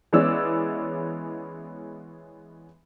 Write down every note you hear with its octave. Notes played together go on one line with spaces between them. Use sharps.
E3 G#3 B3 C#4 D5 E6